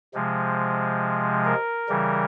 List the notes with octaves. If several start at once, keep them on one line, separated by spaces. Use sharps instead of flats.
C3 F3 G#3
A#4
C#3 E3 G3